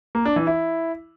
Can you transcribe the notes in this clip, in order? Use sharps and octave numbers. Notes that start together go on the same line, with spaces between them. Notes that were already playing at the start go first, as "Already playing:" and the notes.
A#3
D4
E3
E4